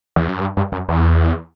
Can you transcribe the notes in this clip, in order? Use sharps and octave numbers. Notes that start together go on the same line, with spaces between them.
E2
F#2
G2
G2
F#2
E2